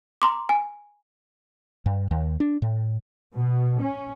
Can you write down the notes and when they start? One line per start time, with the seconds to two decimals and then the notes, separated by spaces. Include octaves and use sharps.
0.22 A#5 C6 D6
0.49 G#5
1.86 G2
2.11 D#2
2.40 D4
2.62 A2
3.35 B2
3.81 C#4